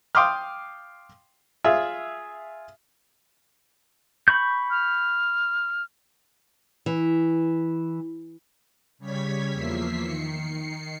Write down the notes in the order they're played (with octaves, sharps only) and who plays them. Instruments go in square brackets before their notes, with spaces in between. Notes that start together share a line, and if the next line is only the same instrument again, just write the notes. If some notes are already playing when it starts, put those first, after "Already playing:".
[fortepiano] F5 G5 C6 D6 D#6 F6
F4 G#4 E5
[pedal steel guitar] B5 C#6 G6
[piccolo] F6
[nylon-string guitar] E3
[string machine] C#3 G3 C#5 G#6 B6
E2 F3 A#3 E5 B6 C7
D#3 C7 C#7